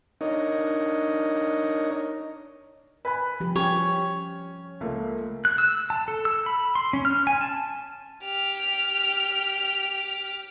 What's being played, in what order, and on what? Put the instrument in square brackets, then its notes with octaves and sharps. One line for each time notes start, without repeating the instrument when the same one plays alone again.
[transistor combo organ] D4 D#4 A#4 C#5 D#5
[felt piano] B4 G#5 B5
[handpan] F3 G4
[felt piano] C#4 [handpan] G4 [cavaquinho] C#5
[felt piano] C#2 A3 A#3
[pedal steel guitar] F#6
E6
A5
A4
E6
B5
C6
C#4
F6
G#5
A5
[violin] G4 F6